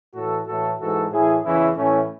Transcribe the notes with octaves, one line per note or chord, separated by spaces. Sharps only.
A2 E3 F#4 A4
A2 E3 F#4 A4
G#2 E3 F#4 A4
A2 E3 E4 G#4
E2 C#3 E3 C#4 E4
A2 E3 A3 C#4